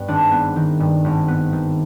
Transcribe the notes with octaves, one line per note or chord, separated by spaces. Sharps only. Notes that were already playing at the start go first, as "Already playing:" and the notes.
Already playing: G2 B3 B4
G#1 D4
B3
D#3
G2
G#1
B3
D#3